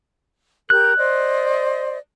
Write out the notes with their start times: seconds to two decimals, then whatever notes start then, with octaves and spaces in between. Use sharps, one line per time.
0.70 G4 A#4 F#6 G6
0.97 C5 D5 D#5